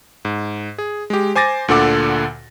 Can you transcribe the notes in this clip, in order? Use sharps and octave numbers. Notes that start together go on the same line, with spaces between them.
G#2
G#4
G#3 G4
C5 G#5 D6 A6 A#6
D2 A#2 D3 A4 F#5 D6